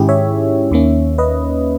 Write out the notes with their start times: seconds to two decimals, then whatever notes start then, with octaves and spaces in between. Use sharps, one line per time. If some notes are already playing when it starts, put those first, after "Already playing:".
Already playing: G#2 D#3 G#3 C#4 E4 G4 G#4
0.09 C#5 E5
0.71 D#2 D#3 A#3 C#4
1.18 B4 D#5